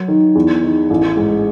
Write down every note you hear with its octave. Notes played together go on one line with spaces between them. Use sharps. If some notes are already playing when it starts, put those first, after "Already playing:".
Already playing: F#3
D#3
E2
D#3
A1
G#2